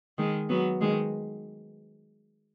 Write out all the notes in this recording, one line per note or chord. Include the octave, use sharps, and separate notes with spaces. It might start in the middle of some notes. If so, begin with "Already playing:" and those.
D#3 G#3
F#3 B3
D#3 G#3